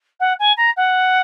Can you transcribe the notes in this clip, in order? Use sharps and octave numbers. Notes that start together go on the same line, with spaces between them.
F#5
G#5
A#5
F#5